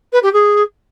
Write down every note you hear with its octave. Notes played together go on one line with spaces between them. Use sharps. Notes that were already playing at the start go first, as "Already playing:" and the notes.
B4
G4
G#4